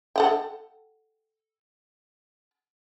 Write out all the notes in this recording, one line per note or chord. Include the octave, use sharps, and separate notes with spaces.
A4 F#5 G5